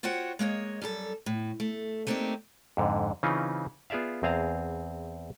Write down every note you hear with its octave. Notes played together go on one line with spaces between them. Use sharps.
F4 F#4 C5 C#5 F#5 G5
G#3 A#3 C#5 D#5
F#2 G3 G4 A4
A2
A3
A3 A#3 C4 D4 D#4 G4
F2 G#2 D3
C#3 E3 C4 C#4 D#4 F4
B3 F4 G#4 D5 E5 F5
E2 C4 G#4 F5 A5 A#5